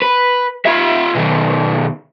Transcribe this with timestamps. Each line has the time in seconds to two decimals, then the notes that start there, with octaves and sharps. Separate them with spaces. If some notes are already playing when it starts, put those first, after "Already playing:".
0.02 B4
0.66 F4 E5
1.15 B2 D#3